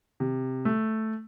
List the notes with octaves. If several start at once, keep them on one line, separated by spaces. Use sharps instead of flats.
C3
A3